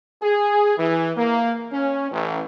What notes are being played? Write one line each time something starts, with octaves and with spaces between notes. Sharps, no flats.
G#4
E3
A#3
C#4
A1